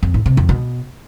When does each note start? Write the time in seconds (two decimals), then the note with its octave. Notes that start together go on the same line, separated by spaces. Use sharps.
0.03 F2
0.14 A2
0.26 C3
0.37 F2
0.49 B2